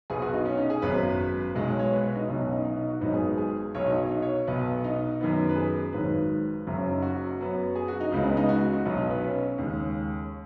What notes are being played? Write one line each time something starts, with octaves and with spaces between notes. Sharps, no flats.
B1 B2 B3 G#4
F#4
D#4
C#4
D#4
G#4
G#1 F#2 F#3 B3 B4
B1 B2 G#3 D#4
C#5
C#5
B4
F#4
D#4
B1 B2 F#3 D#4
C#4
D#4
D#4
D#4
F#4
G#1 G#2 F#3 B3 D#4
G#4
G#4
B1 B2 F#3 C#5
D#4
D#4
C#5
B1 B2 B3
D#4
F#2 D#3 B3
B4
G#4
G#1 G#2 D#3 F#3 B4
F#1 F#2 C#3 F#4
C#4
D#4
F#4
F#2 F#3 B3
G#4
F#4
D#4
C#2 C#3 G#3 B3 D#4
D#4
D#4
F#4
F#4
B1 B2 F#3 B3 D#4
D#4
B4
C#4
D#2 C#3 G#3